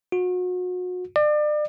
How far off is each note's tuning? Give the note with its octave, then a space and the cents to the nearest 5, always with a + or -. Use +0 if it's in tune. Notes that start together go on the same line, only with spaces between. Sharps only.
F#4 -35
D5 +35